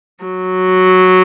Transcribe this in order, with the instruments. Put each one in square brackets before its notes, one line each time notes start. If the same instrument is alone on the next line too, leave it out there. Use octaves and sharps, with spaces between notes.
[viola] F#3